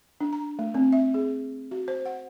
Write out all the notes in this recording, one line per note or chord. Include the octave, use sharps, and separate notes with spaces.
D4
A#5
A3
C4
E5
G#4
F#4
C5
F#5